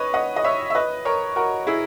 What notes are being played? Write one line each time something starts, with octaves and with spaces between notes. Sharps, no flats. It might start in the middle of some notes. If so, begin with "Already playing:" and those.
Already playing: B4 C#5 D#5
D#5 F#5
D#5
C#5 E5
E5
B4 D#5
A#4 C#5
F#4 A#4
E4 G#4